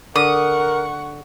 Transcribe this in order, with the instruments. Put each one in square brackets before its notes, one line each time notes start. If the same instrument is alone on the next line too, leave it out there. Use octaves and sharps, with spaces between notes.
[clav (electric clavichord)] D3 [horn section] A#4 [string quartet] F#5 C#6 [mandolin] D#6